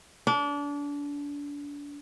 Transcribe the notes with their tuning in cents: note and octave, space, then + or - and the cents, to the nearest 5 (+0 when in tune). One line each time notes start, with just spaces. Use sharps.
D4 -30